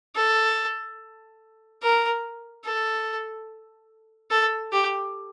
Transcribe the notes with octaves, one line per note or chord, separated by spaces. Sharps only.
A4
A#4
A4
A4
G4